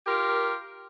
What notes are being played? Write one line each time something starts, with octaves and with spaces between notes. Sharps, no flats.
F4 G4 A#4